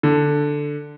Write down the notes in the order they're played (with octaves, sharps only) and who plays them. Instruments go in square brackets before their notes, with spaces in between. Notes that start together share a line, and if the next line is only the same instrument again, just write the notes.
[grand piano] D3